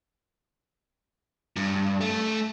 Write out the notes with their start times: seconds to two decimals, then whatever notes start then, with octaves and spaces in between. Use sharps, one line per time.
1.56 G2
2.01 A3